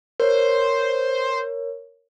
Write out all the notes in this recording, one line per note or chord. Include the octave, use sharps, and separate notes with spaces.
A#4 C5 C#5